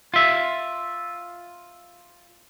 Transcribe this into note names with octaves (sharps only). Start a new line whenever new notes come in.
F4 E5